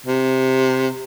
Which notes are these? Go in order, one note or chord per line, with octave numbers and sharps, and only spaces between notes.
C3